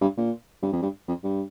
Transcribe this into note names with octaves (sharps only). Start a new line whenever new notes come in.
G2
A#2
G2
F2
G2
F2
G2